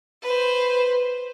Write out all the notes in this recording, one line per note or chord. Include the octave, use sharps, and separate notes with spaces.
B4 C5